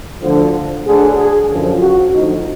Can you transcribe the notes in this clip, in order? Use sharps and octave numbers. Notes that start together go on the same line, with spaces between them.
D2 D3 F3
D2 D3 F#3 G#4
G#4
F#2 D3 F3
F#4
D2 D3 F3 D#4